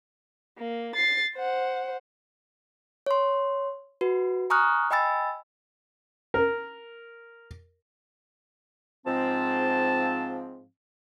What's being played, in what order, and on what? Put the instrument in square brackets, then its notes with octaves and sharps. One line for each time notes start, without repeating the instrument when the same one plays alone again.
[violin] A#3
A6 C7
C5 F#5
[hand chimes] C#5 C6
F#4 B4
G#5 A#5 C#6 D#6 F6 F#6
D#5 G5 G#5 B5 E6 A6
[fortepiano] A#4
[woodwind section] G#2 F3 C4 [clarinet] A5